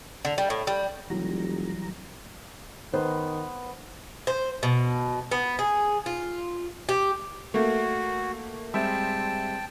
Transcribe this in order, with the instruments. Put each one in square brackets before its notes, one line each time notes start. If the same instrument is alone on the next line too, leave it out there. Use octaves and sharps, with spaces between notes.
[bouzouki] D3
G3
A2
G3
[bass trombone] F1 [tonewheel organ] E3 G3 A#5 [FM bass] F#3
[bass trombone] D#3 [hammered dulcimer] B3 [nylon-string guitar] C5
[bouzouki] C5
B2
B3
G#4
F4
G4
[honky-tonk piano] A3 A#3 [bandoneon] F#4
[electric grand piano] G3 G#3 C4 [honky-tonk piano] E5 [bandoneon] G5 A5